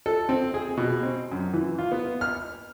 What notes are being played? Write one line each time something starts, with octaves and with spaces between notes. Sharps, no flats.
A4
C4
G#4
B2
C4
F#2
E3
F4
B3
F6